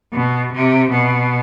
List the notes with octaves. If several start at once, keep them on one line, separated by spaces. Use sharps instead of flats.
B2
C3
B2